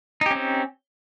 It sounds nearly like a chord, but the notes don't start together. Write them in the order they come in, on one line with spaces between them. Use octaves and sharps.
D#4 G4 C#4 C4